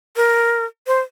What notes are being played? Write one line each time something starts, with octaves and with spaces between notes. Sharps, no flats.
A#4
C5